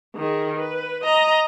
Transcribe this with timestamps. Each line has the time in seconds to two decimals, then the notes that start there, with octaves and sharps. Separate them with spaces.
0.16 D#3 G#4
0.58 B4
1.04 D#5 A#5